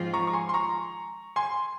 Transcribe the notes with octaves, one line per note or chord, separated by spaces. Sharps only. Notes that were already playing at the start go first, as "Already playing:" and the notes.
Already playing: G#2 F3 C4 F4
A#5 C#6
C#6
G#5 C6
C6
A#5 C#6
G#5 C6